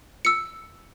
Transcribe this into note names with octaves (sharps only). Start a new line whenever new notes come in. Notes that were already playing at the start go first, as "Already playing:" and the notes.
E6 C#7